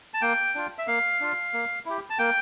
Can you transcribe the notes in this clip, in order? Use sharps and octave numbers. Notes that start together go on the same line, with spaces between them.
A5
A#3 G5
D4 F4
E5
A#3 F5
D4 F4
A#3
E4 G4
A5
A#3 G5